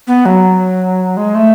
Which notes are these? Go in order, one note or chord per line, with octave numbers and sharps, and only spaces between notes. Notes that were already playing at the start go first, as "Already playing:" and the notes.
B3
F#3
G#3
A3